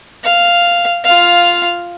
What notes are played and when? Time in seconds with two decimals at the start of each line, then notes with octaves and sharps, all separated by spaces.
0.24 F5
1.04 F4 F5